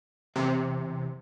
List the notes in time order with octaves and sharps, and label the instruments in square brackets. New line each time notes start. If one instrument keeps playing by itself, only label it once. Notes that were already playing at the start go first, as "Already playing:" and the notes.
[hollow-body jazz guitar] E2 [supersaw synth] C3